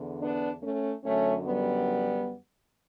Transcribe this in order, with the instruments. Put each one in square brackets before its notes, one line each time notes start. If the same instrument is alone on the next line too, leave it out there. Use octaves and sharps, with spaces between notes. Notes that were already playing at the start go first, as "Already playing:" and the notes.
Already playing: [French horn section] E2 D3
B3 D4
A3 C#4
F#2 D3 A3 C#4
G3 B3